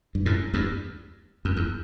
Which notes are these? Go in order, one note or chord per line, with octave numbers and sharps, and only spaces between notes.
G2
F#2 A2
E2 G2
F#2
E2